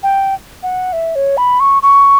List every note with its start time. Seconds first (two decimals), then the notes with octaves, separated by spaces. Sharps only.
0.03 G5
0.63 F#5
0.93 E5
1.15 C#5
1.37 B5
1.60 C#6
1.83 C#6